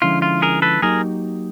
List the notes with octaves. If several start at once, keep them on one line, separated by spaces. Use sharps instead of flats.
D3 F3 G#3 C#4 E4 F4
F4
G#4 A#4
A4 B4
F#3 A#3 D#4 G4 G#4 A#4